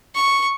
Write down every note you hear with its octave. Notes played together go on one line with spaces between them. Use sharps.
C#6